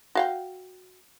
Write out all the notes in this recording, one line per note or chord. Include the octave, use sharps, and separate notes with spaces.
F#4 F5 G5